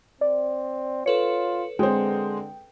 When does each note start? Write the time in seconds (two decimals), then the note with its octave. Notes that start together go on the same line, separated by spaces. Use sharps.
0.21 C4 D5
1.06 F4 A4 B4 C#5 C#7
1.79 D3 G#3 C4 G5